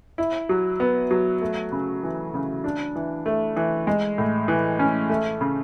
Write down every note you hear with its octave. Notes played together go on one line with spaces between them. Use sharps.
E4
F#3
B3
F#3
A3
C#3
E3
C#3
D4
E3
A3
E3
G#3
A2
E3
C#4
A3
C#3